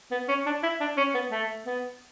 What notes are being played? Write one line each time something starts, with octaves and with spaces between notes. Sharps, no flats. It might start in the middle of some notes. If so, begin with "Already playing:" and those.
B3
C#4
D4
E4
D4
C#4
B3
A3
B3